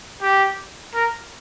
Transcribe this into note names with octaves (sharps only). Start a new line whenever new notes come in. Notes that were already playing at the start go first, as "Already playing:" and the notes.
G4
A#4